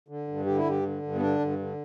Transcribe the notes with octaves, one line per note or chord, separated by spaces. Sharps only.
D3
G2
D3 G4
E4
G2 G4
D3
G2
B3
D3 D4
G2
D3